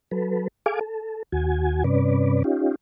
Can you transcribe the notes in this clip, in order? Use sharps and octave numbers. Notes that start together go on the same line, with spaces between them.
F#3 A4 B4
G#4 A4 F5 G#5 D6
A4
D#2 F#4 G#5
G2 C3 C#4 B4 D5
C#4 D#4 F4 G4